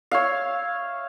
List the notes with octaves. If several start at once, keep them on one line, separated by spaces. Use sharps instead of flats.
C#5 E5 F5